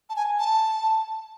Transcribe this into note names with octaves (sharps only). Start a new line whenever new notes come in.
A5
G#5
A5